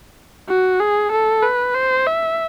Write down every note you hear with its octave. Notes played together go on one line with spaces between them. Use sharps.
F#4
G#4
A4
B4
C5
E5